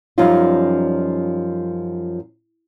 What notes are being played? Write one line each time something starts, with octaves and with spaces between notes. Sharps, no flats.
F#2 F3 G3 C#4 D#4 F4